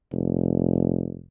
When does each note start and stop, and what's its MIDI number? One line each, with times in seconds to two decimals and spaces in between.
0.12 1.23 29